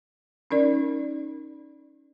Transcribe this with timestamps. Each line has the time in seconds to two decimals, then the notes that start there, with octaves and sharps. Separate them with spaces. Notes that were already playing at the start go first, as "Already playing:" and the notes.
0.51 C#4 D#4 A#4 D5